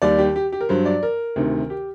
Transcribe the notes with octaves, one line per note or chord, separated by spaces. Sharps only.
D#2 D#3 G3 D5
G4
G4
G4
A#4
G2 F#3 C5
D5
A#4
D2 C3 D#3
G4